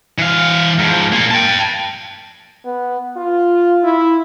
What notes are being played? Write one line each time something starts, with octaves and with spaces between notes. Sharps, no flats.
E3 F5
G#2 F3
A#3 F4
G5 A5
B3
F4
E4